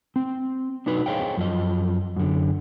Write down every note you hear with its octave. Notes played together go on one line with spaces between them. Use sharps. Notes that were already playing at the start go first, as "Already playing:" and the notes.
C4
D4 D#4 F#4 B4
G#4 C5 C#5 D#5 F5 G5
F#2 F3 D#5
F#2 D3